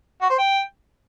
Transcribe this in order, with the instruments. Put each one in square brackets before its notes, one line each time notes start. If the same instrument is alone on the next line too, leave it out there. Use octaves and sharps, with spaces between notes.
[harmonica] F#4
C5
G5